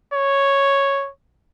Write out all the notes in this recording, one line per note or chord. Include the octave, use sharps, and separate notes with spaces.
C#5